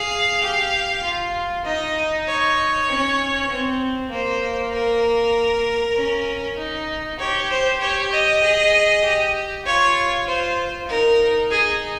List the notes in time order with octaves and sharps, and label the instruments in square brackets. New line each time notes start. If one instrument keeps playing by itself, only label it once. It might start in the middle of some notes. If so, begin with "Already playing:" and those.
Already playing: [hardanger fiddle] G#4 [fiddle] F5
[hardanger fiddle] G4
F4
[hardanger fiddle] D#4 [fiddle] D#5
[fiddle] C#5
[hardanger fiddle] C#4
C4
[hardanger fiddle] A#3 [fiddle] C5
[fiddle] A#4
[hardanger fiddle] C#4
D#4
[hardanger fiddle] G4 [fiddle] C#5
[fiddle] C5
[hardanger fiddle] G4 [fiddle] C#5
[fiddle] D#5
[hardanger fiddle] G#4
G4
[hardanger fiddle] F4 [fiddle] C#5
[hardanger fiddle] F4 [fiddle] C5
[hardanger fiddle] D#4 [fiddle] A#4
[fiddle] G#4